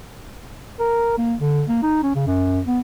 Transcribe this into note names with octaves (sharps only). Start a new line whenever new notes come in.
A#4
A#3
D3
A#3
D#4
C#4
C#3
F#2
B3